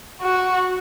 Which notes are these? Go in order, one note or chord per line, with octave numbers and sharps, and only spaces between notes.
F#4